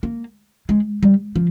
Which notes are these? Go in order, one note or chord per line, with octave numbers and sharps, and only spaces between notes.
A#3
G#3
G3
F3